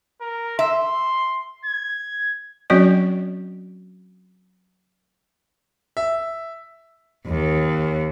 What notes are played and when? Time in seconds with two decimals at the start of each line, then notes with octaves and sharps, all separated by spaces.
0.21 A#4
0.59 E5 C6
1.65 G#6
2.70 F#3 C4 C#4 F#4 D5 D#5
5.97 E5
7.26 D#2